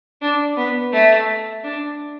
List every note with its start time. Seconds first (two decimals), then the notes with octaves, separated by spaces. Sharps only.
0.22 D4
0.57 B3
0.93 A3
1.63 D4